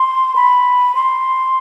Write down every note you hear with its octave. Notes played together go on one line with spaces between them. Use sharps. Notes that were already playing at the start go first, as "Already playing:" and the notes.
Already playing: C6
B5
C6